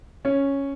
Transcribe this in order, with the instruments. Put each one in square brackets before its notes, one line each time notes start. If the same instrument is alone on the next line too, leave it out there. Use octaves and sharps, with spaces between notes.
[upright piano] C#4